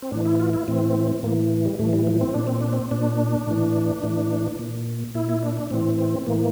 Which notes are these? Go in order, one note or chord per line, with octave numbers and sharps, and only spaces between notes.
C4
A2 E3 D4
E4
F4
E4
A2 E3 C4
A2 E3 A#3
G3
A2 E3 A3
G3
F3
C4
A#2 D4
C4
D4
C4
A#2 D4
A2 E3
A2 E3
A#2
A#2 E4
E4
D4
D4
A2 E3 C4
C4
A2 E3 A#3